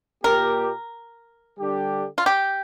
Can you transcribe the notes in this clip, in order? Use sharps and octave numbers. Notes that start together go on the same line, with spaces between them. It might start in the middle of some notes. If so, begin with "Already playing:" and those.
A#2 A#3 G4 A#4
D3 G3 D4 G4
F4
G4